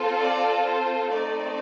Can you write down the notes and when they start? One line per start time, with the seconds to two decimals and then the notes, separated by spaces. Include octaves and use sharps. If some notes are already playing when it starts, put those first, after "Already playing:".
Already playing: C4 F4 A4
0.19 D5
0.64 C5
1.09 A3 C4 D#4 D5